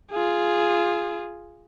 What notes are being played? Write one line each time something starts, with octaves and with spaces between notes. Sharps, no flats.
F4 G#4